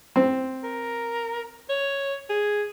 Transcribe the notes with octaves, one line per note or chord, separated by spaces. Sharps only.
C4
A#4
C#5
G#4